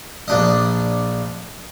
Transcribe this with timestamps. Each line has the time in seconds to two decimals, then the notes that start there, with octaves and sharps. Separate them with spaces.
0.28 A#1 D4 D#5